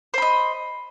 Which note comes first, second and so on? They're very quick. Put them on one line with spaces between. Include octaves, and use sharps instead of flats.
C5 B5 D#5